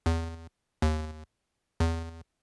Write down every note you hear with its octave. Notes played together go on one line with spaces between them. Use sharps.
E2
D#2
E2